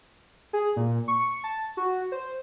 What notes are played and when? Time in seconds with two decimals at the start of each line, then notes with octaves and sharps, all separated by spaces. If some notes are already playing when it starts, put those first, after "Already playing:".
0.53 G#4
0.77 A#2
1.08 C#6
1.44 A5
1.77 F#4
2.12 C5